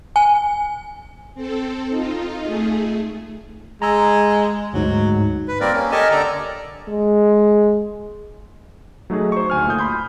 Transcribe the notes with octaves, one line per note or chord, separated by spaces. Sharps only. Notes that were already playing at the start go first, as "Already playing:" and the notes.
G#5
C4 A4
D#4 F4
A3 G#4
G#3 A#5 E6
D2 G#2 F#3
B4
G3 A#3 C4 A#4 D5
A#3 C#4
G4 A4 A#4 D#5 G#5 A5
D3 A4 D5 A#5
G#3
F#3 A3 D#4 F#4 G#4
C5 C#6
D2 G#5 F6
A#2 A3 D#6 G6
B5 C6 G6